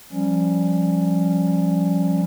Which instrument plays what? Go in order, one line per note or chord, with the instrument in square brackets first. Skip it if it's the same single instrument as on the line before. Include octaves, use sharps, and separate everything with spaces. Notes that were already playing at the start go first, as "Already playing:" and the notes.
[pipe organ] F3 G3 C#4